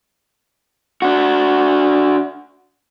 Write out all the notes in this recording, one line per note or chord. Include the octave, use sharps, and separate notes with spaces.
D4 F#4